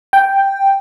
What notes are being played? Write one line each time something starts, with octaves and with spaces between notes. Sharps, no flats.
G5